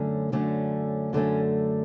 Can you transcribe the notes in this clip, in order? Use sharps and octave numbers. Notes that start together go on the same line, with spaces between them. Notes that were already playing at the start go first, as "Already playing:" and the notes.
Already playing: F#2 D3 A3 C#4
F#2 D3 A3 C#4
F#2 D3 A3 C#4